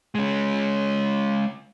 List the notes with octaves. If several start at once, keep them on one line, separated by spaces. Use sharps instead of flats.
G#3 C#4